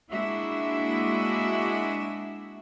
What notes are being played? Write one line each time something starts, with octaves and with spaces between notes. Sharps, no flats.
G#3 A#3 D4 E4 F#4 E5